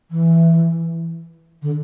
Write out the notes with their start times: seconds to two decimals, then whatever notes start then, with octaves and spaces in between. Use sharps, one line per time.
0.11 E3
1.62 D3